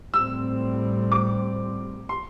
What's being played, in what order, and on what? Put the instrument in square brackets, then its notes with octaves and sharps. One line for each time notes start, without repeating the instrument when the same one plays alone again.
[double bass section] A2 G3 C4 [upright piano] E6
[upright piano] D6
C6